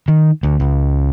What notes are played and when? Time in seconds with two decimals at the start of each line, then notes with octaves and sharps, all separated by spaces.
0.08 D#3
0.43 D2
0.60 C#2